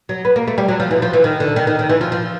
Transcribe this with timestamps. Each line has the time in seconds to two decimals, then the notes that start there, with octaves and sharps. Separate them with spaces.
0.09 F#3
0.25 B3
0.36 A#3
0.47 A3
0.58 G3
0.68 F#3
0.80 F3
0.91 E3
1.02 F3
1.13 E3
1.24 D#3
1.40 D3
1.56 D#3
1.67 D#3
1.79 D#3
1.89 E3
2.01 F3
2.12 F3